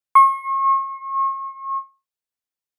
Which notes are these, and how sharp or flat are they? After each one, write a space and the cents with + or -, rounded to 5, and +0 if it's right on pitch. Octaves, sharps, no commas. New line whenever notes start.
C#6 -40